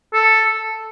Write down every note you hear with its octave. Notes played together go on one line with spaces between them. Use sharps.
A4